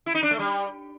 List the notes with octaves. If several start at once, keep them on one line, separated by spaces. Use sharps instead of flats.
E4
D#4
D4
A3
G3